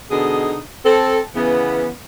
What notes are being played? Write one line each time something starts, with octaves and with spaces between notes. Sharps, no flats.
B2 D3 D#4 G#4
C4 A4
C#3 E3 B3